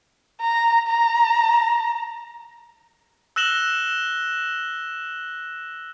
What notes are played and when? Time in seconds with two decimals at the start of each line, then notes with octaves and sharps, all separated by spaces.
0.40 A#5
0.87 A#5
3.36 E6 F#6 A#6 E7 F#7 G7